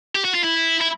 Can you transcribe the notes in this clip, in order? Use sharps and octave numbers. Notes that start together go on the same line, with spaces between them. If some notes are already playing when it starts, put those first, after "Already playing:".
G4
F#4
F4
E4
E4